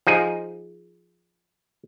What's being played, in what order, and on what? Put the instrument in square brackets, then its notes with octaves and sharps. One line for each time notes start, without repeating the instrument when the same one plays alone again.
[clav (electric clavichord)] F3 D#4 G#4